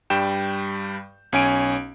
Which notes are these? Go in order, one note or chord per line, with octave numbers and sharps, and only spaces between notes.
G2 G3 G5 G6 E7
B1 C#4 G#5 D7